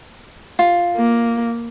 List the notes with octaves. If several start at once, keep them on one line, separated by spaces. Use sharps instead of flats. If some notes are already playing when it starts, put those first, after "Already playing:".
F4
A#3